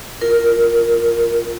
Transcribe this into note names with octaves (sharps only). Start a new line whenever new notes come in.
F4 A#4